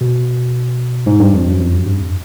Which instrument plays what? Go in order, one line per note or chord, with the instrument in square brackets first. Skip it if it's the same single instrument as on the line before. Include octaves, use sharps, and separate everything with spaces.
[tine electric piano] B2
G#2
G2
F2
F#2
F2
F#2
G2
F2